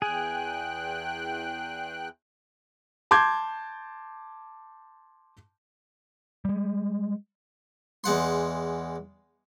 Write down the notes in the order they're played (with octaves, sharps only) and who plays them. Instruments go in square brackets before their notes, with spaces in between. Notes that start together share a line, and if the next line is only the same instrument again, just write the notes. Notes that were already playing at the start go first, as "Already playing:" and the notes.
[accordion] E2 G5 F#6 [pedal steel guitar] G#4
[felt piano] A5 C6 D6 G6 G#6
[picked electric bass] G3 G#3
[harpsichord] E2 G#3 F#5 C6